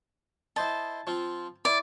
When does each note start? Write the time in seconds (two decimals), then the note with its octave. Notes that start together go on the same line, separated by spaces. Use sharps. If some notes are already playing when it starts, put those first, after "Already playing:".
0.56 E4 C5 D#5 A5
1.07 F3 C4 F4
1.65 E4 D5